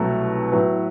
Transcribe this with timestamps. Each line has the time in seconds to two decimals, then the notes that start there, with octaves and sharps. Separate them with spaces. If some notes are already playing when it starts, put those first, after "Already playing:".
Already playing: C2 B2 F#3 A3
0.52 A2 F#3 B3